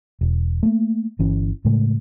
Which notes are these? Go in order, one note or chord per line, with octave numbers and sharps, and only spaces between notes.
E1
A3 A#3
G1 E3 C#4
A2 C#3 G#3 A3